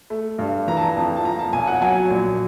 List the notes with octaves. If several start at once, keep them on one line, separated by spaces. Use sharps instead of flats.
A3
G2
E3 A#5
A5
A#5
F2 A5
A5
F3 A#5
A5
B1 G#5
F#5
F#3 G#5
A#1